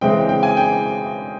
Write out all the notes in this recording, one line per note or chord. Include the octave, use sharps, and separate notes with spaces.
C#3 E3 G#3 C4 G5
G5
G#5
G5